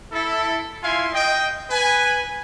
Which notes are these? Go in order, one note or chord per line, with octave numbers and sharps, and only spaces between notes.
E4 A4
E4 F4 F5 G#5 C6
D#5 G5
B4 G#5